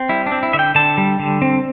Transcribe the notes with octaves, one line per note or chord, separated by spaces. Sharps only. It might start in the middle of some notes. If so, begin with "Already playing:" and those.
Already playing: C4
G3 E4
D4
C4
E4
D3 E5
G5
D3 A5
G3
D3
C4